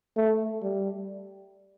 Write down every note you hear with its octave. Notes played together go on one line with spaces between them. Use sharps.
A3
G3